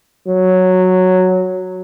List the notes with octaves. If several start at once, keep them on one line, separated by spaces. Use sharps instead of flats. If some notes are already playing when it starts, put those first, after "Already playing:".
F#3